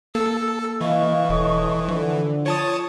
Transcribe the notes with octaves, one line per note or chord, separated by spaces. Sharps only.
A#3 A4 E6
E3 D#5 F5 C#6
E1 A4 C#5 D#5
D3 F3
F4 C#5 A5 D#6